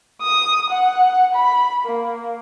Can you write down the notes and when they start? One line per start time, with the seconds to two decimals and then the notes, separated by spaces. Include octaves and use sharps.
0.22 D#6
0.70 F#5
1.35 B5
1.86 A#3